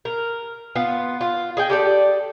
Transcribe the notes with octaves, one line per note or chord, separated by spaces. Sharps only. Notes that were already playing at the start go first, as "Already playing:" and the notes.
A#4
B3 F4
F4
G#4 D#5 G5
G4 A4 D5